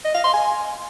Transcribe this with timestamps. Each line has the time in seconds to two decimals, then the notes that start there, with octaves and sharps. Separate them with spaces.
0.05 D#5
0.14 F5
0.24 C6
0.34 G#5